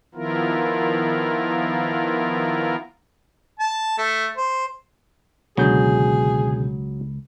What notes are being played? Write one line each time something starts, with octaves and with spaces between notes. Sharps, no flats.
D#3 F3 B3 E4 F4 A#4
A5
A3
C5
C#2 B2 D3 F#3 G#4 G6